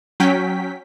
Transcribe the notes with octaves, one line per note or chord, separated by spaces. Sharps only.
F#3 C#4 G5 B6